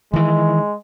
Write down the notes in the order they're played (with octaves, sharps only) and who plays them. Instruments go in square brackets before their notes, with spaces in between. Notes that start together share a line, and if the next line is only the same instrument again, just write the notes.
[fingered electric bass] D#3 E3 [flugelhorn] G#3